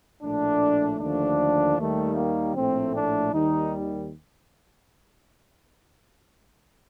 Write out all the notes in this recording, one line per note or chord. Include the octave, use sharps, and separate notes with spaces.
A#1 A2 A3 D4
D#2 D3 F3 A3 D4
D#2 D#3 G3 A3
A#3
A#1 A2 A3 C4
D4
D#2 D#3 G3 D#4